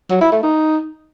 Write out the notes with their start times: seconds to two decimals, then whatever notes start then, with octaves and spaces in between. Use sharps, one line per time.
0.10 F#3
0.21 E4
0.32 A3
0.43 D#4